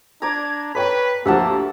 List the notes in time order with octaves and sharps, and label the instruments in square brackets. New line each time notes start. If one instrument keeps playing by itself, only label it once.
[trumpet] D4 [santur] D5 A#5 [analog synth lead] G#6
[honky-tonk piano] A4 C#5 G5 [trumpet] B4 [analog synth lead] B6
[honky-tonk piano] D2 F3 [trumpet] A#3 [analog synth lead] G4 [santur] E5 F#5 A5